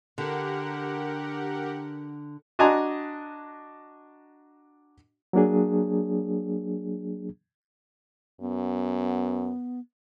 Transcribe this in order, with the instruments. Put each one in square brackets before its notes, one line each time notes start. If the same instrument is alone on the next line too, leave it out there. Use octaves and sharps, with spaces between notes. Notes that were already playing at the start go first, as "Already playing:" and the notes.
[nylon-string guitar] D3 [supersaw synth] G4 A#4 F#5
[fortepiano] D4 F#4 D#5 G#5 A#5 C6
[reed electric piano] F#3 A#3 D4 G#4
[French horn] F#2 [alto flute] B3